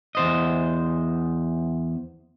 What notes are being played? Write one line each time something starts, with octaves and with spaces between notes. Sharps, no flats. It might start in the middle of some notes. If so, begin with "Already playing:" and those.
E2 C5 D#5